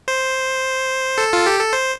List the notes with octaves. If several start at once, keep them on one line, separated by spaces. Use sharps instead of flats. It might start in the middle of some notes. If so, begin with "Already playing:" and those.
C5
A4
F4
G4
A4
C5